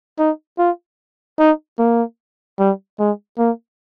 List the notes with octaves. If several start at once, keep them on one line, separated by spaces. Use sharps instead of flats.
D#4
F4
D#4
A#3
G3
G#3
A#3